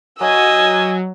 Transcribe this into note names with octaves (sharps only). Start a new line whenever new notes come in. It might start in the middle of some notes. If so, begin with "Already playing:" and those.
F#3 D#5 G#5 E6